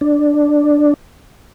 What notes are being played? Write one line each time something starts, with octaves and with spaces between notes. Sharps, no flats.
D4